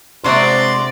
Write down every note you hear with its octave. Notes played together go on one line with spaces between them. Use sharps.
C3 G#3 C4 D4 F#4 D5 A#5 C6